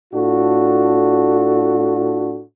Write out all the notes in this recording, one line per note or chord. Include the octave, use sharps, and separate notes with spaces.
A2 D4 F4 F#4 A4